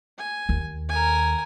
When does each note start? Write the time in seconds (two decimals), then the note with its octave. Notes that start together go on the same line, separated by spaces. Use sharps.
0.18 G#5
0.49 D#2
0.89 A#4 G#5